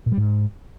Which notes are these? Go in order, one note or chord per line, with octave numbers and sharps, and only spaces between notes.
A#2
G3
G#2